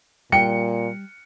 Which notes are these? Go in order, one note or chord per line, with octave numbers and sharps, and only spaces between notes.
A#2 G3 G5 C#7